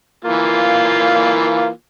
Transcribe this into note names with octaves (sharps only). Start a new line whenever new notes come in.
E3 A#3 F4